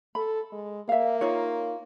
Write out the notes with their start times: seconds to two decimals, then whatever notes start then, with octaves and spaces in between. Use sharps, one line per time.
0.15 A4 B5
0.52 G#3
0.89 A#3 E5 F5
1.21 D#4 F4 C#5